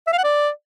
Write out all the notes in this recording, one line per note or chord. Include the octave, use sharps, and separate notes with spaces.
E5
F5
F#5
D5